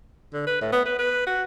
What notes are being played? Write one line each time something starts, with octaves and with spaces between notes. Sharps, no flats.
D3
B4
A2
B3
B4
B4
F#4